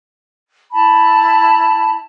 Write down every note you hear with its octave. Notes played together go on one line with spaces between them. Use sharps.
E4 A5 B5